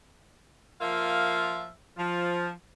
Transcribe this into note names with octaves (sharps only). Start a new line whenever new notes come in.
F3 A#3 F4 E5 F5
F3